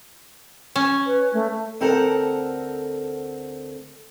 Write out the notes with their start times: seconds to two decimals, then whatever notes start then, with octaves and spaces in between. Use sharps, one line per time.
0.76 C#4
1.06 B4
1.33 A3
1.80 D2 C4 A4 A#4 C5 F#5